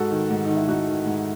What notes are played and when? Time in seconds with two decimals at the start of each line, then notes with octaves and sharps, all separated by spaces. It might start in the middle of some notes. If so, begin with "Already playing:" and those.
Already playing: G#2 F#4 A4
0.11 D#3
0.31 G#2
0.45 D#3 D#4
0.57 E4
0.68 G#2 D#4 F#4
0.88 D#3
1.06 G#2